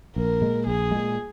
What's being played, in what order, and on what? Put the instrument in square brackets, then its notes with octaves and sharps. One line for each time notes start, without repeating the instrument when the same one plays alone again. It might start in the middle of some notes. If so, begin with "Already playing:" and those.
[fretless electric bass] A#1 [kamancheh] A#4
[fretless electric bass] A#2 G#3
[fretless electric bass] A#1 [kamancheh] G#4
[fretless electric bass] A#2 G#3